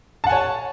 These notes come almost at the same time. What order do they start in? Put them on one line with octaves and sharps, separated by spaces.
A5 F#5 G#5 C#5